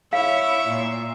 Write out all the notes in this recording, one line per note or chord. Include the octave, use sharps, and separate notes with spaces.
E4 C#5 E5 F5
A#2